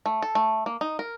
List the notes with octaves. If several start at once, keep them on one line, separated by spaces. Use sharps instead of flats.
A3
A4
A3
A#3
D#4
A#4